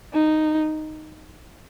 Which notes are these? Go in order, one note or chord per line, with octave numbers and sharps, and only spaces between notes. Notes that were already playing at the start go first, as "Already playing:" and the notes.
D#4